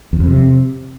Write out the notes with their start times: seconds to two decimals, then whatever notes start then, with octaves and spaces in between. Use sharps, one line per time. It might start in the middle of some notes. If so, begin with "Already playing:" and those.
0.13 E2
0.20 F2
0.28 C3